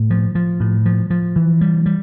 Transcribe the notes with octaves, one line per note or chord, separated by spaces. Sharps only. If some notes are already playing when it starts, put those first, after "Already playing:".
Already playing: A2
F3
F3
A2
F3
F3
E3
G3
G3